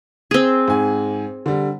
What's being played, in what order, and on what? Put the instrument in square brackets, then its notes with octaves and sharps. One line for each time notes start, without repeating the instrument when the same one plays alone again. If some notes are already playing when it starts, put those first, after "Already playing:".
[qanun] C4 G#4
[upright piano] G#2 G#5
D3 G3